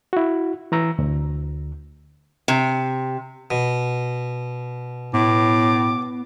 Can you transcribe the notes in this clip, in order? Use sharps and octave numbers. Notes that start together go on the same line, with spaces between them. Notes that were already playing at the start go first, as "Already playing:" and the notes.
E4 F#4
E3 A#5 E6
D2
C3
B2
A2 B3 D6